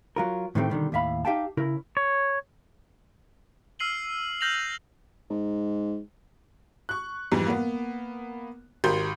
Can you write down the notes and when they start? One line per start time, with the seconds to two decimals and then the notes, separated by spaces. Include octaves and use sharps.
0.16 F#3 F4 A#4
0.55 A2 D#3 E3 A3 C4 G4
0.70 B2 D3 D#3 G3
0.92 D#2 A2 E5 F5 B5
1.25 D#4 G4 E5 F5 G5 A5
1.57 C#3 E4 A#4
1.97 C#5
3.79 E6 F6 C7 D#7 F#7 G7
4.41 F6 G6 A#6 F7 F#7
5.30 G#2
6.89 C#6 F#6
7.32 F2 G#2 E3 G3
7.47 A#3 B3
8.84 G#1 G4 A#4 C6 G6